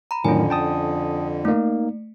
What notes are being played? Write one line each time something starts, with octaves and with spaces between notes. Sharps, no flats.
A#5 B5
F2 A2 D3 D#3 F#3 C#4 G#5
G5 A5 D#6
A3 A#3 D#4